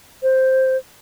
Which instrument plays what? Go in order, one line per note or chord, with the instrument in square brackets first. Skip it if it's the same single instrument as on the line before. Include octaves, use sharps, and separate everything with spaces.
[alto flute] C5